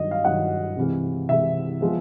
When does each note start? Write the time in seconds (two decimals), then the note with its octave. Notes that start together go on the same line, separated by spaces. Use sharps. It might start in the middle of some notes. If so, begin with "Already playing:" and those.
Already playing: G2 D#3 F#3 D#5
0.11 F5
0.24 G2 D#3 F#3 F#5
0.77 C3 E3 G#3
1.29 C3 E3 G#3 E5
1.81 F3 G#3 B3